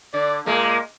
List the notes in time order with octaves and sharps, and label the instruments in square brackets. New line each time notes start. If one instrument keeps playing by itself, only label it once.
[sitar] D3 [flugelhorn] D5
[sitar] A#2 G#3 [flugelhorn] A#3